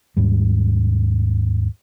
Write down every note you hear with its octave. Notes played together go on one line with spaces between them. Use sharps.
D#2 G#2 G3